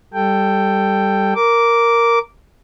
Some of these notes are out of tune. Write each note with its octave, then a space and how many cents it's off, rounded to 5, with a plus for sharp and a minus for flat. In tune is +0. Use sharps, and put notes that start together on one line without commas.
G3 +0 A4 +10 G5 +0
A#4 +0 D6 -10